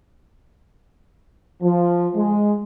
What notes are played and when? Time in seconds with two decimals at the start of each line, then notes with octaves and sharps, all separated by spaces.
1.62 F3
2.14 G#3